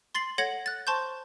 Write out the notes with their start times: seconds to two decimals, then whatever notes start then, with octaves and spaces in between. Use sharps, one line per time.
0.15 C6 A6 C7 F#7
0.38 A4 C#5 F#5 G#6 A#6 F#7
0.66 F#6 A6
0.87 C5 A5 C6 C#6 G6